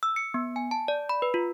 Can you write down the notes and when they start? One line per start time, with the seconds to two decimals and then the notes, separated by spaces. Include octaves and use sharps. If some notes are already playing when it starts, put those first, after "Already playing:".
0.03 E6
0.16 C#7
0.34 B3
0.56 G#5
0.71 A5
0.88 D5
1.09 B5
1.22 B4
1.34 F4